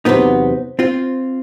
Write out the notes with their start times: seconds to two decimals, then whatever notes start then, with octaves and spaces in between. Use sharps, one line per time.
0.05 E2 C3 D#3 F#3 B3 D#4
0.79 C4 F4